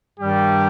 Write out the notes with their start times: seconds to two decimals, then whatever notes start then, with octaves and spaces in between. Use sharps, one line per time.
0.19 G2 D#3 G3 G4